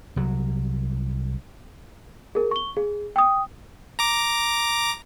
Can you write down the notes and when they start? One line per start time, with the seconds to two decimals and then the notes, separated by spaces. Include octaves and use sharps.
0.16 C2 F#3
2.35 G#4 A#4
2.51 C#6 G7
2.77 G#4
3.16 G5 D#6
3.99 A#5 D6